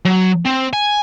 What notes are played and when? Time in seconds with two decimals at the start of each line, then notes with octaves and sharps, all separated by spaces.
0.05 F#3
0.46 C4
0.73 G#5